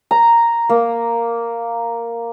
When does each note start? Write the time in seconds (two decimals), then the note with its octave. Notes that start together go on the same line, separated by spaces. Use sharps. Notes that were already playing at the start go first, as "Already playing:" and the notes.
0.11 A#5
0.70 A#3